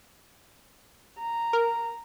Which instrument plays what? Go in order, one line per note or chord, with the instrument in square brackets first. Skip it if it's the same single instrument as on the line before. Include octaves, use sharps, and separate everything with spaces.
[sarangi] A#5
[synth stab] A#4